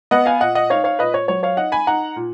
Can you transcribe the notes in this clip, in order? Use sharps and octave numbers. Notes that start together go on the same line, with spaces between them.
B3 D#5 F#5
F5 G#5
A#2 D#5 F#5
D#5 F#5
D#4 C#5 F5
C#5 F5
A#2 B4 D#5
C#5
F#3 C#5
C#5 F5
D#4 D#5 F#5
G#5 B5
D#4 F#5 A#5
A#2